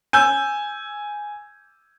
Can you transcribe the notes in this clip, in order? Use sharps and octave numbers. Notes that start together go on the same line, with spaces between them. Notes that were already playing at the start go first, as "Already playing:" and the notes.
G#5 E6 G6